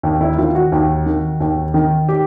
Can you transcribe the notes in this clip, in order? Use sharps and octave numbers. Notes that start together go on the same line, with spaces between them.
D#2
E4
D#3 F4
F#4
D#2
D#3
D#2
D#3
G4